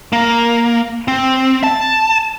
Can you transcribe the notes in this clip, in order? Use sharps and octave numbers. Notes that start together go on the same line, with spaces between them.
A#3
C4
A5